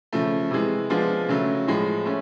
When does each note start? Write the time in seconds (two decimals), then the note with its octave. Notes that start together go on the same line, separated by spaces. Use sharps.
0.12 C#3 F3 A3
0.51 C3 E3 G#3
0.90 F3 G#3 B3 D4 F4
1.29 C#3 F#3 A3
1.67 A2 F3 G#3
2.05 A3 C#4